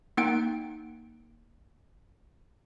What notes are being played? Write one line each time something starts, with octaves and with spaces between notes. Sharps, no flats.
A#3 D#4 F#5 G5 D7